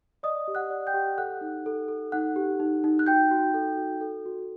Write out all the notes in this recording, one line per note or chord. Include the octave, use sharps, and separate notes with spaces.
D5 D#5 D#6
G4
F#5 F#6
D5
G5 G6
G4
A4 F#5 F#6
D#4
A4
A4
D#4 F#5 F#6
G4
D#4
D#4
F#6
F#4 G5 G6
F#4
A4
F#4
A4
F#4